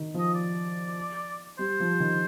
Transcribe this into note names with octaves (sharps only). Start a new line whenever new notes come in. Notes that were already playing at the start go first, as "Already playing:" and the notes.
Already playing: D#3
F3
D#5
D5
G3 C5
F3
D#3